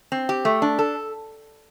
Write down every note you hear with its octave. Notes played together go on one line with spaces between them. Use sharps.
C4
G4
A3
D4
A4